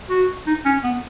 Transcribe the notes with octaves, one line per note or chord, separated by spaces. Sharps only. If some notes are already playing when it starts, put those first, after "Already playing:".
F#4
D#4
C#4
B3